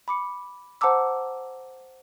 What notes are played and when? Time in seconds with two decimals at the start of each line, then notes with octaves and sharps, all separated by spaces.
0.08 B5 D6 C#7
0.81 C5 F#5 A5 A#5 D6 E6